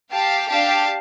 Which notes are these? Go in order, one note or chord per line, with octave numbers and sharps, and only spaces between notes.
G4 F5 A5
D4 G4 F5 A5